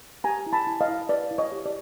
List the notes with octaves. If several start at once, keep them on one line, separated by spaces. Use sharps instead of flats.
G4 G#5 A#5
E4
A5 B5
E4
D#5 F5
E4
B4 D5
E4
C#5 D#5
G4
D5